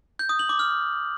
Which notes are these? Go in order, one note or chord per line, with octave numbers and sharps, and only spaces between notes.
G6
D#6
F#7
D6
F6